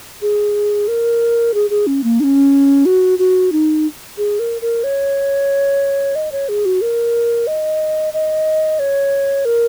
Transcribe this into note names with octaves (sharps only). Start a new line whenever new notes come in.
G#4
A#4
G#4
G#4
C#4
A#3
D#4
C#4
F#4
F#4
D#4
G#4
A#4
A#4
C#5
D#5
C#5
G#4
F#4
A#4
D#5
D#5
C#5
A#4